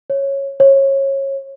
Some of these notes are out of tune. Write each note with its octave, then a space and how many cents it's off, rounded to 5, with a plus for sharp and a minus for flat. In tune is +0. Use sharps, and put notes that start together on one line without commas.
C#5 -10
C#5 -25